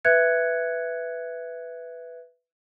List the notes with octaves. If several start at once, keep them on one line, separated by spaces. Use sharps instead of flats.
B4 E5 F#6 G#6 C#7